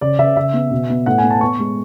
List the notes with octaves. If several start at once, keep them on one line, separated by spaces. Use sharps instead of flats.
C#3 D5
C#3 E5
C#3 E5
B3
B2
B3
A2 F#5
G#5
B3
A5
B3 C#6
G#3